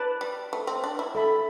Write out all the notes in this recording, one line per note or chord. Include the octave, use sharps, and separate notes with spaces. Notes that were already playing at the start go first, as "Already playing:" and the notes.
Already playing: B4 D5 A5
G3
A3
C4
D4
E4
A4 E5 B5